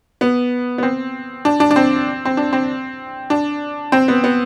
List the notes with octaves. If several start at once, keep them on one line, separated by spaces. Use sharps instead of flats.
B3
B3
C4
D4
D4
D4
C4
C4
D4
C4
D4
C4
B3
B3